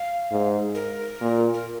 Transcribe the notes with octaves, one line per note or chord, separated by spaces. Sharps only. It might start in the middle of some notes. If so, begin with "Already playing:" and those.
Already playing: F5
G#2
A#4
A#2
A#4